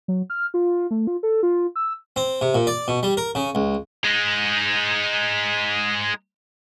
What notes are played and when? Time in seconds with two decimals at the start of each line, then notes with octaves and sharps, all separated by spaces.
0.08 F#3
0.30 F6
0.54 F4
0.91 A3
1.07 F4
1.23 A4
1.43 F4
1.76 E6
2.16 C4
2.41 C3
2.54 A#2
2.67 D5
2.88 B2
3.03 G3
3.17 A#4
3.35 C#3
3.55 C#2
4.04 G#3 D#4